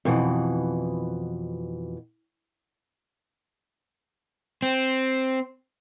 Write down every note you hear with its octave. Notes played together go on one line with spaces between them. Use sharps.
F2 B2 E3
C4